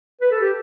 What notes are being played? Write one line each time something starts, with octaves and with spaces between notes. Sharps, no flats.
B4
A4
G4